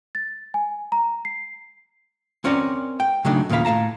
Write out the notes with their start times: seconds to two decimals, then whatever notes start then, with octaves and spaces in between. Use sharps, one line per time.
0.15 A6
0.54 G#5
0.92 A#5
1.25 C7
2.44 C4 C#4 A#4 C#5 D5
3.00 G5
3.25 C#3 F#3 A3 D4 D#4
3.49 D#2 A#2 C#3 A#4 F5 B5
3.65 A2 F5 A5 A#5